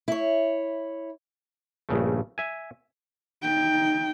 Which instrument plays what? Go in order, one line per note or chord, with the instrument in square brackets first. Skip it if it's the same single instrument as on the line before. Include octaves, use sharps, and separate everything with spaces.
[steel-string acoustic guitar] E4 C#5
[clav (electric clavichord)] A#1 G2 C#3 A3
E5 G#5
[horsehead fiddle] D#4 G5